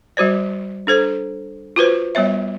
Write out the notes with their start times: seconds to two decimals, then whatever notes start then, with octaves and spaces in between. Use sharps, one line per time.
0.17 G3 F#4 C5 D5
0.87 D4 A4 C5
1.76 F4 F#4 B4 C5
2.15 G3 B3 C#5 E5